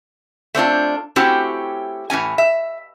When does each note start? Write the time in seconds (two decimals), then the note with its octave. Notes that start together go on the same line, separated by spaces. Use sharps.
0.55 A3 C4 D4 F4
1.16 A3 C4 C#4 E4 F#4 G4
2.10 A2 E3 C#4 G#5
2.38 E5